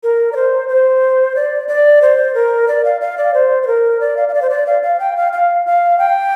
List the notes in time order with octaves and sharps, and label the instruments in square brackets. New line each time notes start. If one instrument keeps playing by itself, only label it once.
[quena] A#4
D5
C5
C5
D5
D5
C5
A#4
D5
F5
F5
D5
C5
C5
A#4
D5
F5
F5
D5
C5
D5
F5
F5
G5
F5
F5
F5
G5